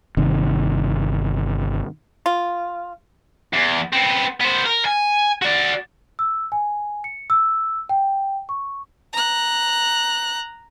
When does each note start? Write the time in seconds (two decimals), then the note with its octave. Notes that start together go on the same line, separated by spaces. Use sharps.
0.17 G1 C3 D#3
2.26 F4
3.53 E2
3.93 B3 C4
4.41 B3 C5
4.65 A#4
4.85 G#5
5.42 F#4 D5
6.19 E6
6.52 G#5
7.04 C#7
7.30 E6
7.89 G5
8.49 C#6
9.13 A#5 F#6